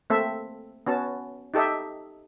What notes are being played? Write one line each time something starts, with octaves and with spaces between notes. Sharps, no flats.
A3 A#3 C4 A4 E5
B3 C#4 F#4 A5
D#4 G4 A4 D#5 E5